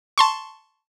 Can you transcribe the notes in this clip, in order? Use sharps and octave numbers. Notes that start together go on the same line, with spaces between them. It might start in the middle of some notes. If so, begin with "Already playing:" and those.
A5 C6 C#6